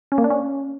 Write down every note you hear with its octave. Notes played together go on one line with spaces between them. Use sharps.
C#4
A#3
D4
C#4